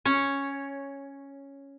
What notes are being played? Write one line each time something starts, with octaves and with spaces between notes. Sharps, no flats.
C#4 C#5